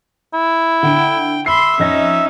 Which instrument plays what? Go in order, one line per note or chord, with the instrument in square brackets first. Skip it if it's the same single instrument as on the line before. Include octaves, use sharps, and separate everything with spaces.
[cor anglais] E4
[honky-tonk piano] D3 [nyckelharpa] G5
[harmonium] E5 [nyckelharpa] B5 C6 [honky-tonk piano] C7
[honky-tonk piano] F2 D#5 A#6 [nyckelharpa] C#4 D#4